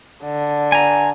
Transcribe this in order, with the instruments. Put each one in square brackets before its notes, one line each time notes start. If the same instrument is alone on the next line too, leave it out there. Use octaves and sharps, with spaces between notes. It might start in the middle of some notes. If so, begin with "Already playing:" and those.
[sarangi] D3
[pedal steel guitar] G#5 A#5